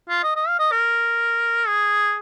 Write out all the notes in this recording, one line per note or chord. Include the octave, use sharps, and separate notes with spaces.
F4
D#5
D#5
F5
D#5
A#4
G#4